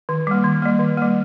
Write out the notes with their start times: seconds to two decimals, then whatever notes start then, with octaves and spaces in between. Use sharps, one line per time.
0.09 D#3
0.27 G3 A#3
0.44 D#3
0.62 G3 A#3
0.79 D#3
0.98 G3 A#3